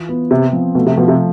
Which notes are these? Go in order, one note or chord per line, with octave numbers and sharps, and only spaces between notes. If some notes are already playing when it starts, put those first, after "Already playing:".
Already playing: E3 F4
B3
C3 C4
F3
B2 A3
C3
B2 F3
C3